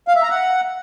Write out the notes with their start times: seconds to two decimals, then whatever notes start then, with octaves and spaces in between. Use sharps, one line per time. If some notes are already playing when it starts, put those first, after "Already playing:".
0.08 F5
0.15 E5
0.23 A#5
0.30 F#5